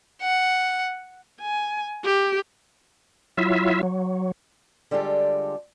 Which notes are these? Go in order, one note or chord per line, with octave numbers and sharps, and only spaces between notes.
F#5
G#5
G4
F#3 E4 F4 E5
F#3
D3 G3 G#3 F4 G4 A4